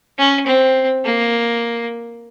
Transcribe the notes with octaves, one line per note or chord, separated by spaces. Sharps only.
C#4
C4
A#3